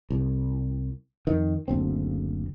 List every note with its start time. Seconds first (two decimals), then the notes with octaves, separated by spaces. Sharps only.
0.10 C2
1.27 F2 D#3
1.68 F#1 D2 C4